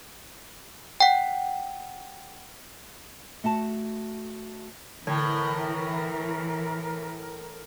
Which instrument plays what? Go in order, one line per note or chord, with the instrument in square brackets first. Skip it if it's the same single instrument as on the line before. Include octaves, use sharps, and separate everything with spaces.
[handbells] F#5 G5
[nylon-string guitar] A3 F#4 A5
[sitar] A2 [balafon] D3 [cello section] E3 [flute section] A#4